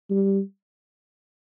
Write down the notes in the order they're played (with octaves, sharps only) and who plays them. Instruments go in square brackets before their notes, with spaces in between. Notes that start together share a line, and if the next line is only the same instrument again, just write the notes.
[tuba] G3